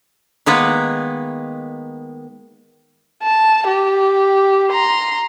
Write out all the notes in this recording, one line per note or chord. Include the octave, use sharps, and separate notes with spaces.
D#3 G#3 A#3 B3 B4
A5
G4
A#5 C6